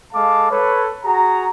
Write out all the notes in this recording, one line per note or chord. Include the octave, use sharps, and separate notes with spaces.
G#3 A4 F5 A5 D6
A4 B4 C#5
F#4 G#4 A#5